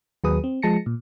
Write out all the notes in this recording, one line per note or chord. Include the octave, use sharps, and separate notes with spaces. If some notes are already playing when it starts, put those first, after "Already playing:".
D#2 F#3 G#4 B4 D#6
C4
F3 G#3 A5 A#6 C#7
A#2